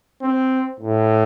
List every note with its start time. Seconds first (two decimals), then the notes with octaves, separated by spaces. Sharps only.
0.21 C4
0.80 A2